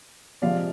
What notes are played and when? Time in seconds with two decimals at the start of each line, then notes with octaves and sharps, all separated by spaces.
0.42 C3 F3 G#3 D5 F5